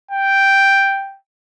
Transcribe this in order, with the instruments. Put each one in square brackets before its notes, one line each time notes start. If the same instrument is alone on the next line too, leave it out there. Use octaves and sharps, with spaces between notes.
[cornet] G5